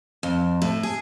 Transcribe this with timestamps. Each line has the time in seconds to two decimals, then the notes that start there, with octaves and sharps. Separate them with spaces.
0.23 F2
0.62 A2
0.83 G#4